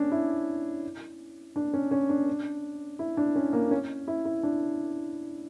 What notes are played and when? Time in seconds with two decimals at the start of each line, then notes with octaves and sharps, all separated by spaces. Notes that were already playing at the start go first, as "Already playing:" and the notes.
Already playing: C#4 D4
0.12 E4
1.56 D4
1.73 C#4
1.91 C#4
2.09 D4
2.99 E4
3.17 D4
3.35 C#4
3.53 A#3
3.71 C#4
4.08 E4
4.25 E4
4.43 D4